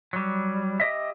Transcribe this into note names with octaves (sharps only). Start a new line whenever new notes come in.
F#3 G3
G4 D#5 E5